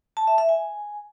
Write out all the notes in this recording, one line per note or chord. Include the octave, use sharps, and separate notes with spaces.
A5
E5
E5
G#5